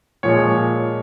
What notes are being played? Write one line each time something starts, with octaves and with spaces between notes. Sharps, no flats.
A#2 F3 G#3 C#5